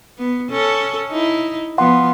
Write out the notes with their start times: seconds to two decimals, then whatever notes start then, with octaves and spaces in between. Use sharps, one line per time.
0.18 B3
0.51 C#4 A4
1.11 D#4 E4
1.78 F3 B3 F5 F#5 C6